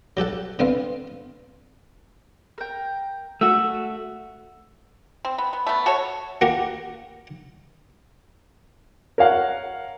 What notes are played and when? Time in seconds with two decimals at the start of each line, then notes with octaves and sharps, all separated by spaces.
0.17 F#3 G4 A4 F#5
0.59 D3 B3 C4 F5
2.58 A#4 G5
3.41 A3 F#4 E6
5.25 C4
5.38 B3
5.53 B3
5.67 A3 B3
5.86 F#4 A4 C#5
6.41 A#3 F#4 G4 A#4
9.18 A#4 C#5 F5 F#5